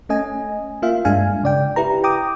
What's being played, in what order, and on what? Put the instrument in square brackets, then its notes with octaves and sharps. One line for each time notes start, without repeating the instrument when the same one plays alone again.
[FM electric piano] A3 C#4 D#5 G#5
A#3 F4 E5 F5
G2 G#3 D4 F5 G#5
C#3 D5 G5
E4 G4 B4 A#5
G5 A#5 D6 D#6